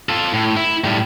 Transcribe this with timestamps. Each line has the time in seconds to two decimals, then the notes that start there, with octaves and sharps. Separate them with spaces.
0.09 F4 A4
0.34 A2
0.56 E4
0.84 A2 G3